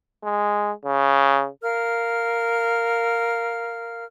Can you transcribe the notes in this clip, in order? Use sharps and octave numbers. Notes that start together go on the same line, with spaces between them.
G#3
C#3
A#4 F5 F6